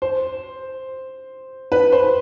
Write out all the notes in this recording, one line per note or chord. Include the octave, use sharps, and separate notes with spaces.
C5
B4
C5